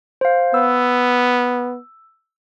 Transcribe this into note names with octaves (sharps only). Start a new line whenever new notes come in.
C5 F5
B3 E6